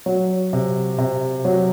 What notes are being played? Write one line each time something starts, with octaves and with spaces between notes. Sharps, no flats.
F#3
C3
C3
F#3